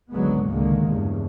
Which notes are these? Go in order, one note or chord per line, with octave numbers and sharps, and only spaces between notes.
G#1 C#2 D3 F#3 G#3 B3
C#2 D3 D#3 G#3 A#3
E2 G2 C#3